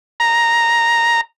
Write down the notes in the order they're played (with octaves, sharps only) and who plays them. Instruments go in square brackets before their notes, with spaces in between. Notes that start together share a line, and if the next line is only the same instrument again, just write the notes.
[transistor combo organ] A#5